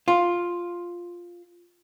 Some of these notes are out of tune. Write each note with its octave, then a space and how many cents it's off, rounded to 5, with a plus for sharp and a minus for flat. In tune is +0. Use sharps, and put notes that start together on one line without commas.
F4 +5